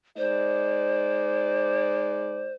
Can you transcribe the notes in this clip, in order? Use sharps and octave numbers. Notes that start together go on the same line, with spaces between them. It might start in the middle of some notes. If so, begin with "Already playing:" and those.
G#3 D#4 C5 D5